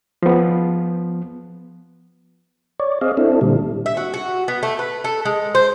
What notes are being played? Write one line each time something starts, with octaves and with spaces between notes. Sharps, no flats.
F3 B3
C#5 D5
C4 G#4 D#5 F5
C4 D4 E4 A4
A#2 D3 G3
E5
F#4
F#4
B3
A3
B4
A4
G#3
C5